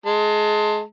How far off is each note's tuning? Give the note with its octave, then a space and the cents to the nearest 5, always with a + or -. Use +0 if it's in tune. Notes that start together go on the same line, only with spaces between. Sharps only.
G#3 +25 A5 +20